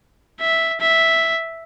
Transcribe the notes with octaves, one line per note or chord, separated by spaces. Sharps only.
E5
E5